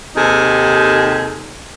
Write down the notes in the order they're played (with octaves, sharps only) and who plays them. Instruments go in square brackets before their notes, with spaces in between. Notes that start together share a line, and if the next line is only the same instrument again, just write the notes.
[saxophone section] D#2 C3 D#4 G#4 A4